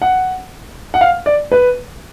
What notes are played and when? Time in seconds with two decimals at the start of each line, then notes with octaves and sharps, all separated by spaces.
0.02 F#5
0.94 F#5
1.01 F5
1.26 D5
1.52 B4